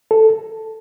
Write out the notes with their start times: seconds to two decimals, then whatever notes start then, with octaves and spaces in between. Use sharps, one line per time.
0.11 A4